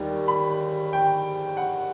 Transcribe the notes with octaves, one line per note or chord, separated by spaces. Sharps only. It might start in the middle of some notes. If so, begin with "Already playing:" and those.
Already playing: D#2 D#3 G3
B5
G5
F#5